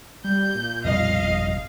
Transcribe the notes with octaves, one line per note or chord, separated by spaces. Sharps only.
G3 G6
A#2
B1 F2 G3 D#5 F5
G1